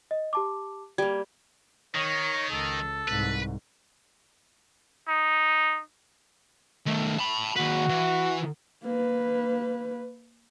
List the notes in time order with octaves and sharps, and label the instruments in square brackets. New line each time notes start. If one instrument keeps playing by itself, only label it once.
[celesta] D#5
G4 A5 D6
[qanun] G3 A#3 [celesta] G#6
[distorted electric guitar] D#3 [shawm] C#5
[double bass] C#2 [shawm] A4
[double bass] C2 G#2 [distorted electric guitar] B4
[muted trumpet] D#4
[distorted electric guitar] D#3 A3
A5 B5
[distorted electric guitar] D#2 B4 [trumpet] F#4
[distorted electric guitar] E3
[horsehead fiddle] A#3 B4